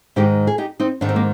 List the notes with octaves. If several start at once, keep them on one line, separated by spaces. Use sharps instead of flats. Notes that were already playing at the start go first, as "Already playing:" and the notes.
G#2 D#3 G#3 D#4 G4
G#4
D#4 G4
C4 D#4
G#2 D#3 G#3 D4
C4
A#3